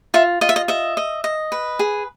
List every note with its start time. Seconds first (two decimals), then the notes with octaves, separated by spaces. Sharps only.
0.14 F4 E5
0.41 F4 D#5
0.49 E5
0.56 D#5
0.68 D#5 E5
0.97 D#5
1.24 D#5
1.52 B4
1.79 G#4